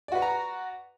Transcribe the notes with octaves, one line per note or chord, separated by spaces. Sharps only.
F#4 B4 D5 F#5 A#5